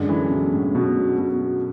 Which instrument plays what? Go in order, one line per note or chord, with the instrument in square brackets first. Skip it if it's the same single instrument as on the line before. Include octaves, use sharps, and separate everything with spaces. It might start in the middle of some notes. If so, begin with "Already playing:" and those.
Already playing: [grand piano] F#2 D3 G#3 D4
[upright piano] E3
B2
A2
B2
B2